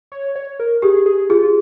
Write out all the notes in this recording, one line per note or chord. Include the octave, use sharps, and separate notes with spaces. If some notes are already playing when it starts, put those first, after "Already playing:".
C#5
C#5
A#4
G4 G#4
G#4
F4 G#4